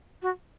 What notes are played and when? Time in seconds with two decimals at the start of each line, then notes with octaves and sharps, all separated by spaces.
0.22 F#4